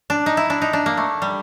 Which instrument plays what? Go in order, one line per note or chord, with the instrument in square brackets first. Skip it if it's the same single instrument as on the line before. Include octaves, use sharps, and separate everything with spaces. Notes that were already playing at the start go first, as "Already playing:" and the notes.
[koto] D4
D#4
E4
D4
D#4
D4
A#3
A3
G3